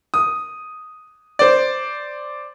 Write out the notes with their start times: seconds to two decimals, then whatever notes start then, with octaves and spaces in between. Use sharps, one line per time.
0.14 D#6
1.39 C5 D5